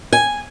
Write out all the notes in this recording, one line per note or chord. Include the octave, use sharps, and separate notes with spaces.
G#5